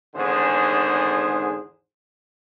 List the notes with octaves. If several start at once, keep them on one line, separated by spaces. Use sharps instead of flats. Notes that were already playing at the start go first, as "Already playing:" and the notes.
G#1 E2 G#2 D3 G#4 C5